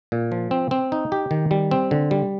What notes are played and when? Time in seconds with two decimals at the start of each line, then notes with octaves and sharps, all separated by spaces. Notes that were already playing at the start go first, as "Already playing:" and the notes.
0.12 A#2
0.32 F3
0.51 C4
0.71 C4
0.92 D#4
1.12 G4
1.31 D#3
1.51 G3
1.71 C4
1.91 D3
2.11 G3